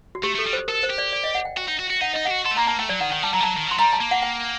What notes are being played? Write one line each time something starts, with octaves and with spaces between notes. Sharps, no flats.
F#4
A3 G4
A3
A4
G3
C5
A4 A#4
C5
G4
D5
D5
D#5
F#5
G5
F#4 G5
D#4
F#4
F#4
D#4 F#5
D#4 D#5
G4 F#5
F#4
A4 C6
A3
A#3 A#5
A#3 A5
A3 G5
F#3 D5
D#3 F#5
D#3 G5
G3 A5
F#3 A#5
G3
F#3 A5
D#3
F#3
C6
G3 A#5
A5
A#3
F#5
G5